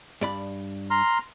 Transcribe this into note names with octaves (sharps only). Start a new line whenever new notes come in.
G2 D5 B5
A#5 C6 F6